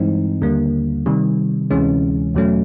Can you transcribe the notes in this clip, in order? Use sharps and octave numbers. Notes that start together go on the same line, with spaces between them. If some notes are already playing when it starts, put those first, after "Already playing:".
Already playing: G2 E3 G#3 C4 D#4
D#2 D3 G3 A#3
C3 D#3 G3
D2 C3 E3 G#3 C#4
E2 B2 F#3 A3 C#4